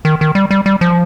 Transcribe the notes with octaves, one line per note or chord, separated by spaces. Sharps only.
D#3
D#3
G3
G3
G3
F3